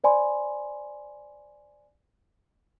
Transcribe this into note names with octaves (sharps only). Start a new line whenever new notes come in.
C5 D5 G#5 B5 C6